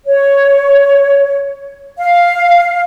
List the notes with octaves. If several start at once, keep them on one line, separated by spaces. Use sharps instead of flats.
C#5
F5